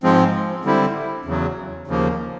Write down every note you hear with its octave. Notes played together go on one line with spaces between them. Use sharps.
G#2 F3 G#3 C4
D3 G3 C4 E4
E2 C#3 F#3
D#2 C#3 F3 A#3